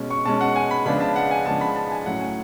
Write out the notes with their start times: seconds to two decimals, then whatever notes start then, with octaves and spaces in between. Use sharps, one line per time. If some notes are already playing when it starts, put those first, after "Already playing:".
Already playing: B2 G#3 C#4
0.11 C#6
0.25 B2 G#3 C#4 A5
0.41 F#5
0.56 G#5
0.71 B5
0.85 C#3 F3 G#3 B3 D4 B5
1.01 A5
1.16 F#5
1.31 G#5
1.46 C#3 F3 G#3 B3 D4 A5
1.61 B5
1.76 A5
1.91 G#5
2.06 A2 F#3 C#4 F#5
2.21 G#5